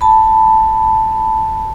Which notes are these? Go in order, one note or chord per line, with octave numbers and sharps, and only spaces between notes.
A5 B5